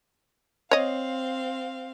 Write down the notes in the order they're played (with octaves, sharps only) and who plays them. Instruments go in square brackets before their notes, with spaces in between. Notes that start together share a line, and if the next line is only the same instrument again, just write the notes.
[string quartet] C4 F5 [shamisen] C#5 D#5